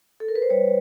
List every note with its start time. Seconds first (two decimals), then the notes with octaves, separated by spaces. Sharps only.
0.20 A4
0.28 A#4
0.35 B4
0.42 C5
0.50 G3 B4 C#5